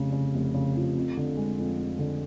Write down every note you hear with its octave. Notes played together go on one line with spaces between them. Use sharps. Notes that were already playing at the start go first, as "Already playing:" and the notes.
Already playing: F1 C#3
C#3
F1
C#3
F3
F2
D3
G#3
F2
F2
D3